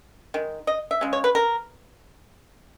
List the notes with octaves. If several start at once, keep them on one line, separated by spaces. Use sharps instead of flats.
D#3 G#3
D#5
E5
C#3 G#3
C#5
B4
A#4